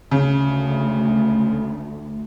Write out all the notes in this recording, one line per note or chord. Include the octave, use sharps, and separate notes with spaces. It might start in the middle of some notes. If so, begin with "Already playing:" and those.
D2 C#3